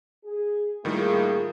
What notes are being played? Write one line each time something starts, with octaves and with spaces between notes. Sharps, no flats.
G#4
A2 D#3 G3 A#3 F4 G#4